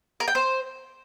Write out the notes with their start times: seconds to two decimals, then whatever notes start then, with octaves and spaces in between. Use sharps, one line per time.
0.20 A#4
0.28 G5
0.35 C5